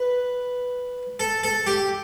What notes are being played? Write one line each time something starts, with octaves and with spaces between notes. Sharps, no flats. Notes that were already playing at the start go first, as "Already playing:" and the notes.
Already playing: B4
A4
A4
G4